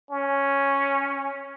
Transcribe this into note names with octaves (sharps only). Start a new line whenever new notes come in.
C#4